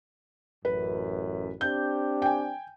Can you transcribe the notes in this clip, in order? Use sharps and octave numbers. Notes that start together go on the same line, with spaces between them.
A1 F#2 B4
C4 D4 G4 G6
G5 G#5